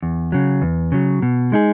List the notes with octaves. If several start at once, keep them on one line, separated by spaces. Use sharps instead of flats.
E2
C#3 F#3
E2
C#3 F#3
B2
G#3 D#4 G#4